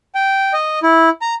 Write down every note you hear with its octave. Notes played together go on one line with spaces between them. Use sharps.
G5
D#5
E4
A#5